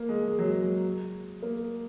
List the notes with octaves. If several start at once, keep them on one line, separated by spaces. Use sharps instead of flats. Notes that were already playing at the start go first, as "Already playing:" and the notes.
Already playing: A#3
G#3
G#3
F#3
G#3
A#3